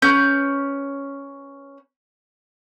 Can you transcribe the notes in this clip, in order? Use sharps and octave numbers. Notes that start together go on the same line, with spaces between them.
C#4 B4 G6